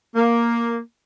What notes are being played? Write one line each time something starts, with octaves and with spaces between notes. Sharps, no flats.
A#3